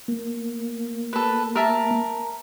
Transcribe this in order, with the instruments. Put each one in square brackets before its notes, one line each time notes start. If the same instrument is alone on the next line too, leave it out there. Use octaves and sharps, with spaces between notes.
[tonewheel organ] A#3
[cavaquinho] A4 B4
A#4 E5 A5